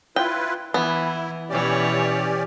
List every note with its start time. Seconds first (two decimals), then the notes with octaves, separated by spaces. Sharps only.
0.16 E4 F4 B4 G5
0.74 E3 B3 E4
1.50 B2 E3 C#4 G4 C#5 D5